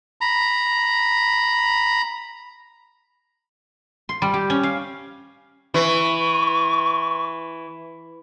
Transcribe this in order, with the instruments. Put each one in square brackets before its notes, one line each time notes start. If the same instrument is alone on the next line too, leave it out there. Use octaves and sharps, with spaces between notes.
[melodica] A#5 B5
[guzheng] C6
G3
G4
C#4
F5
[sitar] E3 [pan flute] C#6